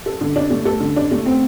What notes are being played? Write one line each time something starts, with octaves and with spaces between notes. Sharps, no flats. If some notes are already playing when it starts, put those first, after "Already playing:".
A4
D3
D4
A3
A4
D3
D4
A3
C4